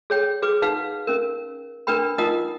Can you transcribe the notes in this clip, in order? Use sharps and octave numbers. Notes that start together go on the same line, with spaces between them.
G#4 C#5 G5
G#4 B4 D6
D#4 B4 F5 F#5
C#4 A#4
D4 A#4 B4 G5 B5
D#4 F4 A#4 D#5 F#5 D#6